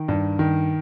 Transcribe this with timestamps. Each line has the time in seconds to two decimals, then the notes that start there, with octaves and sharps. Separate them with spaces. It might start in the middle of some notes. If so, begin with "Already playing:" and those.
Already playing: D#3
0.08 G2
0.39 D#3